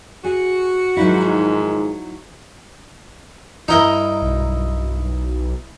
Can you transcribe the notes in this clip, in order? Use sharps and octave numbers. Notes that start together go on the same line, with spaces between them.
F#4 G#4
G#2 D#3 F3 F#3 D#4 E4
G2 D#4 E4 A#4 D#5 A#5
B1